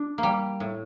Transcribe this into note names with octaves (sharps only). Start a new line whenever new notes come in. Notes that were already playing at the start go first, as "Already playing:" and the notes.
Already playing: D4
A#3
G3
A2